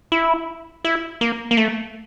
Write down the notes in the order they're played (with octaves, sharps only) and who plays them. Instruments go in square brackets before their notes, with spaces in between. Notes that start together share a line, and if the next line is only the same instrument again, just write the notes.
[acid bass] E4
E4
A#3
A#3
A3